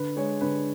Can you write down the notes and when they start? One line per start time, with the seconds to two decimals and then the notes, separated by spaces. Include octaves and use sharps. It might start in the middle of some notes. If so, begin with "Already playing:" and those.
Already playing: D3 B4
0.16 G#3 C#5
0.41 D3 B4